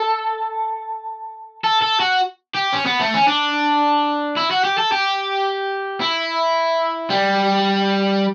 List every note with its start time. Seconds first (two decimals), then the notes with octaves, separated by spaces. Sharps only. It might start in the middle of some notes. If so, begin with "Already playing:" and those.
Already playing: A4
1.64 A4
1.81 A4
2.00 F#4
2.55 G4
2.73 C#4
2.86 B3
3.00 A3
3.14 C#4
3.28 D4
4.37 E4
4.51 F#4
4.64 G4
4.78 A4
4.92 G4
6.01 E4
7.10 G3